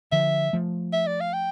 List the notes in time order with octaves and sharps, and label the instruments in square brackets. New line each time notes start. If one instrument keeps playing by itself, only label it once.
[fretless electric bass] D3 F3 [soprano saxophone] E5
[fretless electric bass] F3 A3
[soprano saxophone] E5
D5
F5
G5